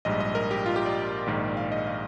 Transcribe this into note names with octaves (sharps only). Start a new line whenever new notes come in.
A#1 G#2 G3 D#5
D#5
A#4
G4
F4
G4
D5
A#1 G#2 D#3 A#3
F5
D#5
F5